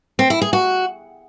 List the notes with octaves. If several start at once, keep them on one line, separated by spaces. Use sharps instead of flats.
C4
E4
G#4
F#4